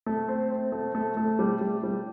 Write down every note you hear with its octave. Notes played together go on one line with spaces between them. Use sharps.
A3
C4
C4
A3
A3
A3
G3
G3
G3